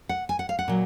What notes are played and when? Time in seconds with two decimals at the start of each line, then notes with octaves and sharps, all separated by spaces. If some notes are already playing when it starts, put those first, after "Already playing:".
0.09 F#5
0.29 G#5
0.39 F#5
0.49 F5
0.59 F#5
0.68 A#2 F#3